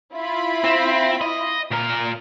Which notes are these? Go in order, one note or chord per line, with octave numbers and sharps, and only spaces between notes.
E4 F4 B5
C4
D#5
A#2 A#4